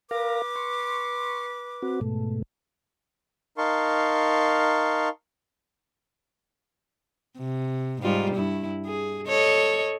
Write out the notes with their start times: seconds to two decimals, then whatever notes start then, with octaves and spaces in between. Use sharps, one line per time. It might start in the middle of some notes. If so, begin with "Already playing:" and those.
0.11 A#4 B4 F5 D6 A#6
0.56 C6 C#6
1.83 C4 F#4
2.01 G#2 B2 A3
3.58 D#4 A#4 F5 A5 C6 C#6
7.38 C3
8.02 G#2 G3 F4
8.35 G2 E4
8.86 G#4
9.27 A4 C#5 D#5